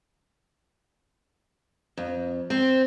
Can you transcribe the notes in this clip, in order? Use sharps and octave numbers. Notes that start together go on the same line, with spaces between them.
F2
C4